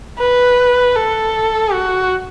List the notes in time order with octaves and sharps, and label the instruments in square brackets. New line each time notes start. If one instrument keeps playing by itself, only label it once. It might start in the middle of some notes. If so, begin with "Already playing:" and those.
[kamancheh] B4
A4
F#4